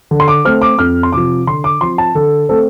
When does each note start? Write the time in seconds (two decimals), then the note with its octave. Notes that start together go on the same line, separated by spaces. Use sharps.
0.11 D3
0.20 C6
0.28 D6
0.45 A3 C4 F6
0.62 D6
0.79 F2 F6
1.03 C6
1.12 C3 F3 D6
1.47 D3 C6
1.64 D6
1.81 F3 C4 C6
1.98 A5
2.15 D3 A4
2.49 A3 C4 A4